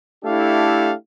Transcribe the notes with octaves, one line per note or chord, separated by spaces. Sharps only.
A3 D4 E4 G4 A4 F5